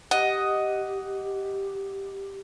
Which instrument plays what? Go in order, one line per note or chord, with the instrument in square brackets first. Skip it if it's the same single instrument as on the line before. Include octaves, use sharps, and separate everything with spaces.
[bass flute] G4 [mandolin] D#5 [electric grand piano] F#5